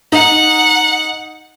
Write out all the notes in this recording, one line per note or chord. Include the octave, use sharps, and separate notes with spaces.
D#4 F#5